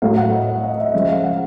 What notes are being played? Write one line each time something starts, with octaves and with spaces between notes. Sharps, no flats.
A2 F#3 A3 F5
F#5
D#5
D#5
D#5
E5
C#3 F3 G#3 E5
F5
F#5